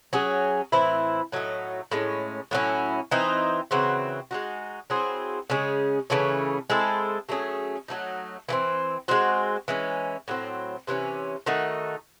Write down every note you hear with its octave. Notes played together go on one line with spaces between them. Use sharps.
F#3 C#4 G#4
A2 E3 C4 E4
A2 F#3 A3 D#4
A2 G#3 C#4
A2 F#3 C#4 E4
E3 C4 D#4
C#3 E3 C4 F#4
G#3 D#4 F#4
F#3 C4 E4 G#4
C#3 G#3 C#4 G#4
C#3 E3 A3 C#4
G#3 C4 E4 A4
F#3 A3 C#4 G#4
F#3 A3 D#4
E3 A3 C4
G#3 C4 F#4
E3 G#3 C#4
A2 F#3 C4
C3 E3 A3 C#4
D#3 A3 D#4 F#4